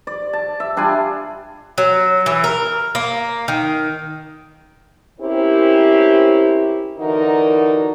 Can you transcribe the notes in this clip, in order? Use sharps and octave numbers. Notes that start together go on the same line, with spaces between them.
D5
A5
E5
G3 D4 F4 G#5
F#3
E3
A#4
A#3
D#3
C4 C#4 E4 G4 A#4 C5
D3 E3 D#4 F#4 A#4